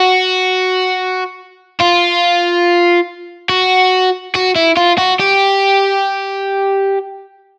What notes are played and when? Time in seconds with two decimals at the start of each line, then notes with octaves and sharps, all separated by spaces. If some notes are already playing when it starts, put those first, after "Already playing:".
Already playing: F#4
1.81 F4
3.49 F#4
4.35 F#4
4.56 E4
4.77 F4
4.98 F#4
5.19 G4